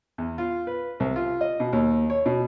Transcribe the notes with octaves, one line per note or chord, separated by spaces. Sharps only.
E2
F4
B4
C2
F4
D#5
B2
D#2
C#5
B2